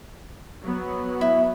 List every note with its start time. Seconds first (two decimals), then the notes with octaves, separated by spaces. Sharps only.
0.61 F#3 B3
1.21 E4